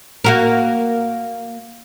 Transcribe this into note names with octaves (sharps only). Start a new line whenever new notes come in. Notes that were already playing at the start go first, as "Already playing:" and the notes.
A#3 F#4 A#4